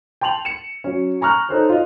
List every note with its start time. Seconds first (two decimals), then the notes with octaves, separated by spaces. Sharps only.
0.21 G5 A5 C6 F7 F#7
0.45 C#7 E7
0.84 F#3 C#4
1.21 G#5 A#5 C#6 F6 F#6
1.49 D#4 A4 C5 C#5
1.69 F4 D#5